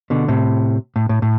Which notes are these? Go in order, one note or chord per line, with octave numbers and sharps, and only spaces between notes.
B2 D3
A2 C3
A2
A2
A2